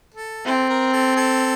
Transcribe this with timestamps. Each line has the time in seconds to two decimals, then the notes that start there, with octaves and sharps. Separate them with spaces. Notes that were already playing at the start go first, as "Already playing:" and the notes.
0.14 A4
0.46 C4 E4 A4
0.69 A#4
0.93 A4
1.16 A4